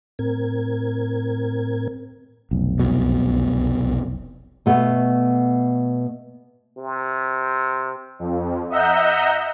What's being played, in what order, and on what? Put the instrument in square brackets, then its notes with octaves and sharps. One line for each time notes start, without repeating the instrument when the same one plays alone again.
[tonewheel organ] A2 C4 A#4 G#6
[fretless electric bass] F1 B1
[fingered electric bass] C2 B2
[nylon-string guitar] B2 A3 B3
[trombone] C3
[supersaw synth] F2
D#5 E5 F#5 A#5 E6 G6